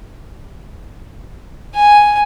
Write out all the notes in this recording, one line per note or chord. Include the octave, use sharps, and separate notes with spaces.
G#5